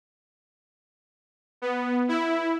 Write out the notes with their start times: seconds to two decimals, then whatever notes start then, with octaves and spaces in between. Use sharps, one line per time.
1.62 B3
2.09 E4